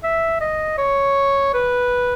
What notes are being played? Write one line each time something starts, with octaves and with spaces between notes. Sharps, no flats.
E5
D#5
C#5
B4